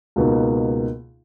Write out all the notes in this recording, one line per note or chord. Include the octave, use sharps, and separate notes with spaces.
C#2 B2 A#3 D#4